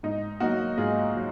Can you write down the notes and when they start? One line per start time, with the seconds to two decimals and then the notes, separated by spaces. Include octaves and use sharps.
0.03 G#2 D#4
0.40 F#3 A#3 D#4 F#4
0.78 G#2 F4 G#4
1.15 F#3